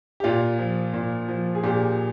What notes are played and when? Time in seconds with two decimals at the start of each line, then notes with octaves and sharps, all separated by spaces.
0.20 G4
0.24 A#2 F4
0.58 F3
0.94 A#2
1.28 F3
1.55 G#4
1.63 A#2 G4